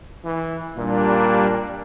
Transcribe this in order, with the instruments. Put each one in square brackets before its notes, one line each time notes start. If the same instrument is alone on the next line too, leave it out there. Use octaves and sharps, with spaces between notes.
[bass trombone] E3
[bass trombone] A#2 [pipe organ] G3 A#3 D4